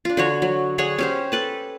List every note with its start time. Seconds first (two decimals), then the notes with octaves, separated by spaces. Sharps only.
0.05 D4 F4
0.17 D3 F#4 C#5
0.42 F#3
0.78 D3 G#4 C#5 F#5
0.98 C#4 G4 C5
1.32 A4 B4 A5